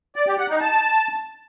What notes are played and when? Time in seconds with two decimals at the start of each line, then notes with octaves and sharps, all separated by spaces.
0.16 D5
0.27 G4
0.38 F#5
0.50 D#4
0.61 A5